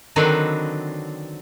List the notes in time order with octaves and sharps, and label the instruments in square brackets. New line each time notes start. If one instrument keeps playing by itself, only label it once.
[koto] D3 D#3 F#3 C4 D4 B4